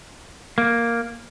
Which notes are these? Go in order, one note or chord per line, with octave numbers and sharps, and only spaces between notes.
A#3